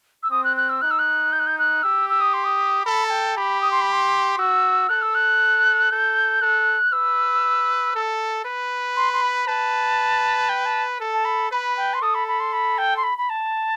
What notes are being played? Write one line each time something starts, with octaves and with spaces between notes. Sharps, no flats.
E6
C4 D#6
F#6
F#6
E6
D#4 F#6
E6
F#6
G6
F#6
G6
F#6
G4 E6
E6
D#6
C6
D#6
A4 B5
A5
G5
G4 B5
D#6
C6
B5
C6
F#4 E6
A4 F#6
E6
F#6
A4 G6
A4 F#6
B4 E6
A4
B4
C6
C6
B5
B4 A5
G5
A5
A4
A5
B5
B4 B5
G5
C6
A4 D#6
B5
B5
C6
B5
G5
C6
B5
B5
A5